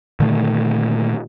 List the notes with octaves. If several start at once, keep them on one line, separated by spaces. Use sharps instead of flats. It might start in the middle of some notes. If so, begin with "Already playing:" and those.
A#2 D3 D#3 A3